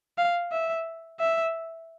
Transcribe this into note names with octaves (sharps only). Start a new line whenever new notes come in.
F5
E5
E5